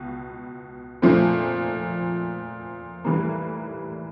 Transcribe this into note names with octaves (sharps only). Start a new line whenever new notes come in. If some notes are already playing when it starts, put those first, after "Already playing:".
Already playing: C#2 B2
A#2 F3 A3 C4
A2 E3 G3 A#3